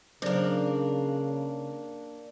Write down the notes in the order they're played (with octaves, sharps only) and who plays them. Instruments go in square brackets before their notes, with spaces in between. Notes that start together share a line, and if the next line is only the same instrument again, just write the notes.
[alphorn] C#3 [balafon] F#3 C5 D5 [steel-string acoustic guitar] A#3 D4